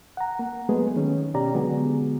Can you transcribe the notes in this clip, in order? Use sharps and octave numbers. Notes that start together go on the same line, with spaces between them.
F#5 A#5
A#3
F#3 G#3 A3 B3 G#4 B4
D#3 C#4
B2 C#4 G4 D5 A#5
D3 F#3 G#3 B3 F#4 G#4